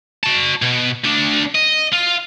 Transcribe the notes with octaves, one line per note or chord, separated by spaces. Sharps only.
F#4 A5
B2
D2 D4
D#5
F4